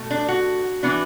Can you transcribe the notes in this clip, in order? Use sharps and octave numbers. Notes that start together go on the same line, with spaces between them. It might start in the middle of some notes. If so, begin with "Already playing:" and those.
Already playing: B2 A3
D4
F#4
E3 B3 D4